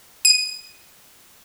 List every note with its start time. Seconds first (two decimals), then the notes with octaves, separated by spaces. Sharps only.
0.25 D#7